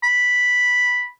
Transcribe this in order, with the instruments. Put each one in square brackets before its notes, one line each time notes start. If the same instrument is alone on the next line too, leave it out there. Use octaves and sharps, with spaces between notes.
[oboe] B5